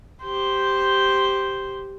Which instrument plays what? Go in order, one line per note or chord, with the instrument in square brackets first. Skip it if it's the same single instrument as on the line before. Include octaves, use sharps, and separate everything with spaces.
[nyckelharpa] G4 C5